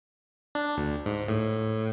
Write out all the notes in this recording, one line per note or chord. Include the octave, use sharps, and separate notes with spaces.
D4
D2
G#2
A2